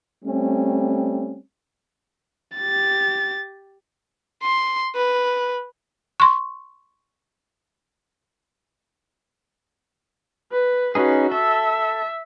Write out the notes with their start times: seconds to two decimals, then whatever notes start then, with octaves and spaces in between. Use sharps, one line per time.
0.25 G3 A3 C4 C#4
2.56 G4 A6
4.43 C6
4.95 B4
6.20 C6 C#6
10.52 B4
10.95 C#4 D#4 F#4 G#4 B4
11.32 A4 E5